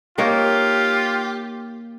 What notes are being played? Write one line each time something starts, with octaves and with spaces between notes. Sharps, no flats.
A#3 D#4 F4 G4 C#5